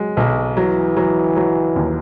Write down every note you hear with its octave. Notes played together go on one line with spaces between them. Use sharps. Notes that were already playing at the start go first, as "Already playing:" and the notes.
Already playing: F#3 G#3
B1
E3 F#3
F#3
F#3
D#2